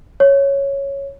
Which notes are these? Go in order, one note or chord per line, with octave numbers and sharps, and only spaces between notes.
C#5